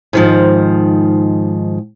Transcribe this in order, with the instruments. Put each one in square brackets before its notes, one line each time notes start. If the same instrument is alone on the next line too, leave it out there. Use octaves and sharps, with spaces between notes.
[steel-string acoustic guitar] G#2 D#3 F3